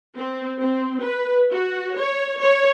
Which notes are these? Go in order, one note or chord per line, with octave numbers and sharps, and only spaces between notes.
C4
C4
B4
F#4
C#5
C#5